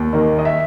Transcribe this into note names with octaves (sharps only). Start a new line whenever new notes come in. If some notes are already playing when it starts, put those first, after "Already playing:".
Already playing: D#2
D#3 A#3
D#5
E5